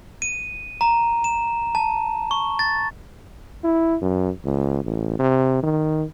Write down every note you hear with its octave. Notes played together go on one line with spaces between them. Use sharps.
D#7
A#5
E7
A5
C#6
A6
E4
F#2
C#2
A1
C3
D#3